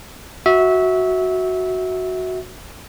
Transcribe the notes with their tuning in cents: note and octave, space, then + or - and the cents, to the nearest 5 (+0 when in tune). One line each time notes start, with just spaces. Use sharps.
F#4 +0 E5 -20